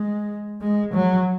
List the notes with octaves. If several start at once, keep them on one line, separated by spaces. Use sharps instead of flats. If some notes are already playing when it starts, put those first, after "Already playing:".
Already playing: G#3
G#3
F#3